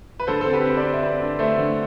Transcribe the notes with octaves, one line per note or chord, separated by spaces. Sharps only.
B4
D3 A4 C5
A4
C4
G4 B4
C4
B4 D5
C4
E5
C4 B4 D5
D3
A3 C5 E5
D3